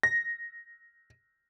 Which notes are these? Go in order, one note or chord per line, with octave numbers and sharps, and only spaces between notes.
A#6